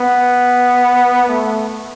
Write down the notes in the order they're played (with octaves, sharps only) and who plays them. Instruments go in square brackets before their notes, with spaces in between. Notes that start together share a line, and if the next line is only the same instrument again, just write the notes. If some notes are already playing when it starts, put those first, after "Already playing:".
Already playing: [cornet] B3
A3